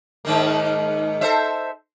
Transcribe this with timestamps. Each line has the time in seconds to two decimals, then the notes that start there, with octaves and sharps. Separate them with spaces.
0.25 G#2 D#3 A#3
1.21 A4 C5 E5